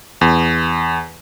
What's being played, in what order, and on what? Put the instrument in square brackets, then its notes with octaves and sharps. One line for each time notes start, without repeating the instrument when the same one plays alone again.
[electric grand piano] E2